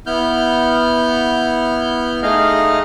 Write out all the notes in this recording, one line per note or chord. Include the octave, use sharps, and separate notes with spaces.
B3 E4 F6 G6
A3 D#4 G#4 D#5 F5 F6